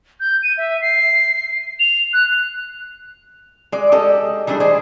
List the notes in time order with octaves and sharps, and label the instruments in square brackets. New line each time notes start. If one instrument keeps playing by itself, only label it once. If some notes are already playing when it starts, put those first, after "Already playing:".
[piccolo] G6
D#7
E5
C7
F7
F#6
[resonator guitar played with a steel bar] G#3 D5
G#3 G4 A4 D#5
E3 G3 A3 D4 G#4
G#4 C5 D5 D#5